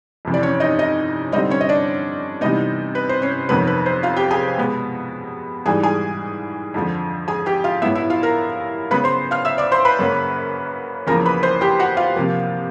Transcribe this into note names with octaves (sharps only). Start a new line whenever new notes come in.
F2 C3 E3
D5
C#4 C#5
D#4 D#5
D#4 D#5
D3 G3 C4 D#4 D#5
C#4 C#5
D#5
D4 D5
C3 E3 G3 B3 D#4 D#5
B4
C5
C#4 C#5
F2 C3 D#3 F#3 B3 B4
B4
C5
F4 F5
G4 G5
G#4 G#5
B2 G#3 B3
G#2 E3 G3 G#4 G#5
G#4 G#5
F2 D3 F3
G#4 G#5
G4 G5
F4 F5
A2 F#3 B3 E4 E5
E4 E5
F4 F5
A#4 A#5
C#3 F#3 B3 B4 B5
C5 C6
F5 F6
E5 E6
D5 D6
C5 C6
B4 B5
F#2 C#3 F#3 A#3
E2 C#3 F3 A#3 A#4 A#5
B4 B5
C5 C6
G4 G5
F#4 F#5
F4 F5
C3 F3 A#3